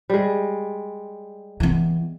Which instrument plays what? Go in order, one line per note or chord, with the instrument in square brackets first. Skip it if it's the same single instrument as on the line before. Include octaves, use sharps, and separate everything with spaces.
[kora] G3 G#3
[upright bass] E3 B3